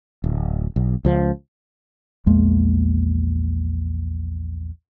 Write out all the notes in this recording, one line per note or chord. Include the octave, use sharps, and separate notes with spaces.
D1
B1
C#2 F3
A#1 E2 G#3 A#3